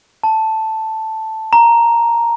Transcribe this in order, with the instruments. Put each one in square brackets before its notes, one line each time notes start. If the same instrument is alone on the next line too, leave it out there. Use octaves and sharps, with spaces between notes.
[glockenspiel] A5
A#5